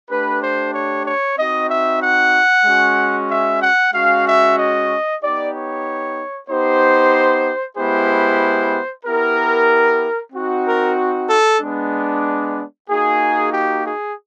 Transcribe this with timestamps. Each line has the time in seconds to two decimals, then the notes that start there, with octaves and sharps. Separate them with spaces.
0.10 A3 D4 G4 B4
0.42 C5
0.74 C#5
1.06 C#5
1.38 C4 D#4 F#4 D#5
1.70 E5
2.03 F#5
2.66 G#3 C#4 F#4
3.29 E5
3.62 F#5
3.94 G#3 C#4 F#4 F5
4.26 E5
4.58 D#5
5.21 B3 D#4 G4 D5
5.54 C#5
6.49 B3 D#4 G4 C5
7.77 G#3 B3 E4 G4 C5
9.06 B3 E4 G4 A#4
10.33 C4 D#4 F#4
10.65 A#4
11.30 A4
11.61 G#3 B3 D4
12.90 A#3 D#4 F#4 G#4
13.53 G4
13.85 G#4